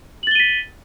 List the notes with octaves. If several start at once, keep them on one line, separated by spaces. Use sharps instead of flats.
A6 B6 D#7 F#7 G7